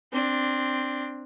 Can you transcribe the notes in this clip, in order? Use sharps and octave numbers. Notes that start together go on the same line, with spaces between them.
C4 D4